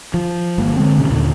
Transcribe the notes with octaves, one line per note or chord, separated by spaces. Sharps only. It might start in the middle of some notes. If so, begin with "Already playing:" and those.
F3
G1 A#3
D3 F#3 G#3 C4
G#1 C3 A3 C#4
D#2 A#2 D3